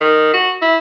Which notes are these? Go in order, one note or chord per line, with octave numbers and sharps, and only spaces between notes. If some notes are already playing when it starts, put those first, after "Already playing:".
D#3
F#4
E4